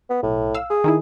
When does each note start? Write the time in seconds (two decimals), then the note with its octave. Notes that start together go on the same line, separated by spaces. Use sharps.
0.10 B3
0.23 B1 A2
0.55 F5 E6
0.70 G#4
0.84 D#3 D#4 E4